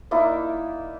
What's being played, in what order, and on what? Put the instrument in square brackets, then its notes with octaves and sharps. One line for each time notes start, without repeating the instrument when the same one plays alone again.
[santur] A#3 D#4 E4 D5